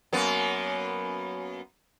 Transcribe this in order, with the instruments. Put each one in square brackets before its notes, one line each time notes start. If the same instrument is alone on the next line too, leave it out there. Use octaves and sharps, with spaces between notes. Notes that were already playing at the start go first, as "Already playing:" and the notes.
[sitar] F#2 A#3 B3